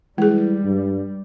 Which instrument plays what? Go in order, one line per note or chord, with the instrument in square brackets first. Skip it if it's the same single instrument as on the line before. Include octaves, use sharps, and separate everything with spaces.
[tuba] E3 [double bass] G3 [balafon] G#3 G#4
[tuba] G2